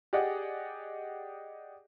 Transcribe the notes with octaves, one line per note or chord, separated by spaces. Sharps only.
G4 G#4 D5 D#5 F#5